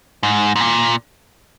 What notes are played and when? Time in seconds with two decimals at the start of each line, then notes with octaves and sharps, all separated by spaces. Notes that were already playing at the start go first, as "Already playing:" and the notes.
0.23 G#2
0.56 G#2
0.61 A#2